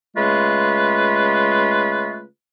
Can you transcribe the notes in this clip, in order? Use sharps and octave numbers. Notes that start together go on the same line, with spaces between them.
C#3 G#3 A3 F4 B4